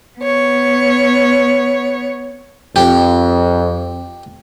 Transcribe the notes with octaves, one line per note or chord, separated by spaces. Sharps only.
B3 C#5
F2 G4